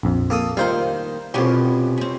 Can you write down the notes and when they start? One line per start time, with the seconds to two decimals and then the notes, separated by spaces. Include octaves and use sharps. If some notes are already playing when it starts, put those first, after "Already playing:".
0.03 A#1 F2
0.30 A#3 A4 D#6
0.57 D#3 G3 A#3 D#4 F4 C5 F5
1.34 C2 F2 B2 C#4 G4
1.98 C4 C#4